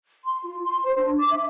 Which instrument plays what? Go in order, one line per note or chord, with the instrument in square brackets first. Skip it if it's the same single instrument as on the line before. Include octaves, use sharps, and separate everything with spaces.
[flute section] C6
F4
C6
C5
D4
D6
E5